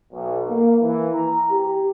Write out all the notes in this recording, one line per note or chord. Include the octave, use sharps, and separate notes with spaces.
B1
A#3
E3
A#5
G4